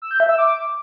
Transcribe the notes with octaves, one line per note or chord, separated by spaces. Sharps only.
E6
G6
E5
E6
D6